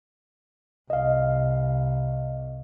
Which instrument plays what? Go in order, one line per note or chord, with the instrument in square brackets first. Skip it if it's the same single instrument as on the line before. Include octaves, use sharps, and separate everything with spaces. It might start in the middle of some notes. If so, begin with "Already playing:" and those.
[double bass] C2 [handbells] D#5 F5